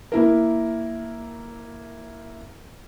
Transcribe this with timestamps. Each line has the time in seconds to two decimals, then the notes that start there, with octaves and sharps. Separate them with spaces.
0.12 A#3 E4 A#4